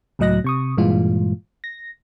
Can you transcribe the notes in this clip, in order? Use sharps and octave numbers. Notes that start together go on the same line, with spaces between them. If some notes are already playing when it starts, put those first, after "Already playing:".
C#2 A2 F#3 D#5 F#6 A#6
C3 C#6 D#6
G2 A#2 E3 G#3 F4
A#6